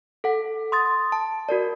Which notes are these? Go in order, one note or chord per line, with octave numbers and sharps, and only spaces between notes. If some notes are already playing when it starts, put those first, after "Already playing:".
A4 F#5
C6 D#6 A6
A5
F#4 A#4 D5